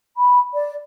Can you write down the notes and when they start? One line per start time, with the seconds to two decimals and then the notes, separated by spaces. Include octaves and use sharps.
0.16 B5
0.53 D5